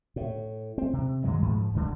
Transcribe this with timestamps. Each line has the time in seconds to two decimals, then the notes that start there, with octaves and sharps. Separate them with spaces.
0.16 A2
0.78 C4
0.93 C3
1.24 G2 D#3 F#3 G#3
1.42 G#2 F3
1.74 E1 D2 D3